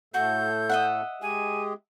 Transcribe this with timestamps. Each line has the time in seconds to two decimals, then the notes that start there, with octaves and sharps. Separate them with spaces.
0.14 A2 A3 F#4 A4 G6
0.69 D#5 E5 F#5
1.22 G#3 G4 G#4 G#5